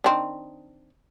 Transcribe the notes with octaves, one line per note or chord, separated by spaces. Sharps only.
D#3 C4 D4